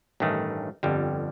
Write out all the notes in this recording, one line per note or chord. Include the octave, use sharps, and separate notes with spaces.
A1 G2 D#3 A3
G1 F2 D3 G3